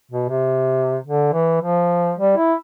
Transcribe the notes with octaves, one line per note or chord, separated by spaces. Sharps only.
B2
C3
D3
E3
F3
G3
E4